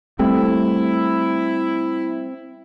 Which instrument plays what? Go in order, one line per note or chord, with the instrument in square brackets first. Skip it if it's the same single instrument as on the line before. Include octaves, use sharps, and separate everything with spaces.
[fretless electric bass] G3 A3 [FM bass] C4 [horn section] E4